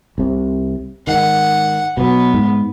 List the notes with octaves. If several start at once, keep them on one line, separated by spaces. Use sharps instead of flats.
C2 C3
G#2 D#3 F#5
B2 F#3 B3
G#2